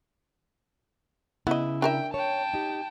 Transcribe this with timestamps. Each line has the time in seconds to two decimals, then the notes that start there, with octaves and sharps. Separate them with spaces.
1.47 C#3 B3 E4 D#5
1.82 D4 A#4 E5 G5
2.14 C#5 G5 A5
2.54 D#4 G4